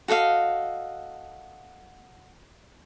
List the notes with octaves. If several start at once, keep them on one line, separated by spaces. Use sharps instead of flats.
F#4 A4 D#5 F5